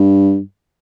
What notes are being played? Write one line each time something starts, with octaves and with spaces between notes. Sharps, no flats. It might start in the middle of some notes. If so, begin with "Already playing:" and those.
Already playing: G2